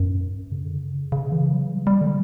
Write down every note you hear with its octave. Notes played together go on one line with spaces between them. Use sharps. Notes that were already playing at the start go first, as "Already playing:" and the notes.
Already playing: F#2
C#3
D3
C#3
C#3
E3
F#3
G3
G3
D3